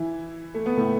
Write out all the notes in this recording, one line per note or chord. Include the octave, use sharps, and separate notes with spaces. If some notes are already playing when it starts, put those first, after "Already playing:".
Already playing: E3 E4
A3
B3
A2 A3